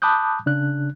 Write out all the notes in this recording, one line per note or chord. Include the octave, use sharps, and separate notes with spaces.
A5 B5 D6 D#6 F#6 G6
C#3 D4 F#6